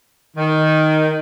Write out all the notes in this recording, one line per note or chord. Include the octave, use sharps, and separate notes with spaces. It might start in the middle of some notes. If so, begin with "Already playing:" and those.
D#3